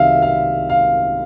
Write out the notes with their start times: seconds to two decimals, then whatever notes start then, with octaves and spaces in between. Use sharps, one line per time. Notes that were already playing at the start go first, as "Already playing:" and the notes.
Already playing: C2 C3 D#3 F#3 E5 F5
0.22 F5
0.69 F5